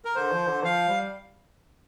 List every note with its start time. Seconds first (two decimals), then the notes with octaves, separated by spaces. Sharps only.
0.05 A#4
0.15 D3 C5
0.32 F3
0.48 D3
0.63 F3 F5
0.89 G3